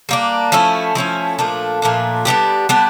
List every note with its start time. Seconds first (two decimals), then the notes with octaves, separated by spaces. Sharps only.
0.09 G3 A#3 D4
0.52 F3 A3 C#4 E4
0.95 F3 A3 C#4 E4
1.39 A#2 F3 A3 D4
1.82 A#2 F3 A3 D4
2.25 G3 B3 D4 G4
2.69 G3 B3 D4 G4